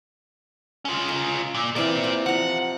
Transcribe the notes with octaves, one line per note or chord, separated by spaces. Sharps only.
C#4 F4
A#4
A#2
C3 E3 A#3 D5 G5
C5
F3 F#5 A#5